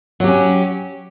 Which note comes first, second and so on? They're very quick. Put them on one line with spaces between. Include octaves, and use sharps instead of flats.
F#3 G4 C#4